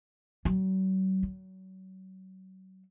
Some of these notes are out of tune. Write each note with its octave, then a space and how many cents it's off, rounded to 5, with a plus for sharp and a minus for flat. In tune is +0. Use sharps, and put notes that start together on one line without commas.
F#3 +40
F#3 +30